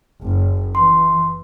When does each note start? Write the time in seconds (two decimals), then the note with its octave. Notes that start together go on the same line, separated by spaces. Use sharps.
0.22 F#1
0.75 E3 C6